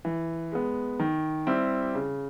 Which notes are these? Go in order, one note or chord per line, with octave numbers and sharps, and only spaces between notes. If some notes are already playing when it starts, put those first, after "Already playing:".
E3
G#3 B3
D#3
G3 C4 E4 G4
C#3